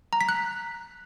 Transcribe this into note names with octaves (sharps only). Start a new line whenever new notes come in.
A#5
B6
F#6